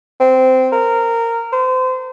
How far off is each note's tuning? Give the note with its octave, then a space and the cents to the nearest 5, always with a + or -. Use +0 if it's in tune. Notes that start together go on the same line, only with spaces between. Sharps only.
C4 -15
A#4 -15
C5 -30